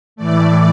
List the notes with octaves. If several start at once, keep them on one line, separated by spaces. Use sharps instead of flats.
A2 E3 A3 D5